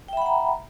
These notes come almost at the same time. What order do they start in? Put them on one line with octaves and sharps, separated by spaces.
G5 E5 B5 F#5 A#5